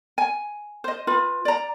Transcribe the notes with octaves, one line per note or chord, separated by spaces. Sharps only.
G#5
C5 D#5
F4 B4
D5 A#5